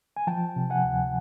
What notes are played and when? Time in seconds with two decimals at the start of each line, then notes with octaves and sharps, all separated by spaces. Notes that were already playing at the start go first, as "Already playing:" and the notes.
0.17 G#5
0.27 F3 G5 A5
0.56 C3
0.70 F#5 G#5
0.84 D2